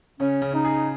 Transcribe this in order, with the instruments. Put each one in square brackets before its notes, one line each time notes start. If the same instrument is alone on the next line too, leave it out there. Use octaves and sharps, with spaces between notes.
[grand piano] C#3 [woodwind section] C#4
[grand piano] C#3
[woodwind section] D#4
[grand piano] G#4